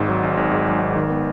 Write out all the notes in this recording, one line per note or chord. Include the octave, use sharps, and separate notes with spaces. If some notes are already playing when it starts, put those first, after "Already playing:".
Already playing: G#1 G#2
F#3
G#1
G#1
G#2
F#3
G#1
D#3
B3